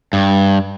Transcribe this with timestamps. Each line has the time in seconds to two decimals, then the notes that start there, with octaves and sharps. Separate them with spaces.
0.13 G2